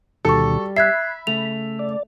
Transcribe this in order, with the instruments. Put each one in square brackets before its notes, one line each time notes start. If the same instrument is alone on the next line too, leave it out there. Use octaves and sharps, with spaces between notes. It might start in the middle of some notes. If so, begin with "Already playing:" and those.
[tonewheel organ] D2 B2 D#3 [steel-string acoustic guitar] G3 D5 [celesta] F#4 C#6 [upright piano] A4
[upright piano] E5 [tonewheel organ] B5 [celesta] F#6 G#6 C7
[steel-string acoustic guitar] C#3 A3 [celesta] F7
[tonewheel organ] D5